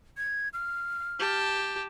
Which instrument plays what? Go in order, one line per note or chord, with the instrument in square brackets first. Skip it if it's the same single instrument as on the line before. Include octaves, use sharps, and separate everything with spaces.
[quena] G#6
F6
[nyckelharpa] G4 A5